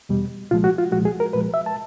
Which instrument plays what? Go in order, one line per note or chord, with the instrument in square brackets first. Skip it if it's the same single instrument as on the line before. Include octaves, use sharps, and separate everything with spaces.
[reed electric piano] E2 B2 G3
C2 A#2 F3 G#3 F4
F#4
F4
C2 A#2 F3 G#3 F#4
G#4
A#4
C2 A#2 F3 G#3 B4
E5
A5